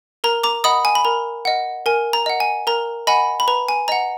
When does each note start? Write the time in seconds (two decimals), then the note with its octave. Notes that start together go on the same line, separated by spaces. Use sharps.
0.24 A#4 A#5
0.43 A#5 D6
0.64 D#5 F#5 B5 D#6
0.85 G#5
0.95 B5
1.05 A#4 A#5
1.45 D#5 F#5
1.86 A#4 G#5
2.13 A#5
2.26 D#5 F#5
2.40 G#5
2.67 A#4 A#5
3.07 D#5 F#5 G#5 B5
3.40 B5
3.48 B4 A#5
3.69 G#5
3.88 D#5 F#5 A#5